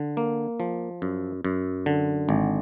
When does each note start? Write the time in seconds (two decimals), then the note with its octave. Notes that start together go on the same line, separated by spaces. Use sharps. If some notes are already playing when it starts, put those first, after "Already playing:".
Already playing: D3
0.17 A#3
0.60 F3
1.02 F#2
1.45 F#2
1.86 D3
2.29 G#1